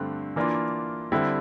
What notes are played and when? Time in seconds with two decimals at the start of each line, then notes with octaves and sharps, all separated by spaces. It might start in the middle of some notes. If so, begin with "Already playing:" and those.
Already playing: G2 D3 A3 C4
0.36 E3 A#3 D4 F4
1.12 D3 G3 C4 E4